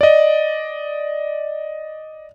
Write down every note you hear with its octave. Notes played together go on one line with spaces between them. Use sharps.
D5 D#5